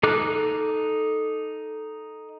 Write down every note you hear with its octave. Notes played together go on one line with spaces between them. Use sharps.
D#4 A4 D6 F6 F#6